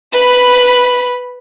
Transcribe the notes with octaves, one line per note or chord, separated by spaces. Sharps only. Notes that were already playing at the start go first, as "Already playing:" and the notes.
B4 B5